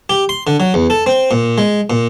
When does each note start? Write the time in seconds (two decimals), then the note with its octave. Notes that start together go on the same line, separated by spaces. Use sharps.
0.10 G4
0.29 C6
0.47 D3
0.60 F#3
0.74 E2
0.90 A4
1.06 C4
1.31 A#2
1.58 G#3
1.90 A#2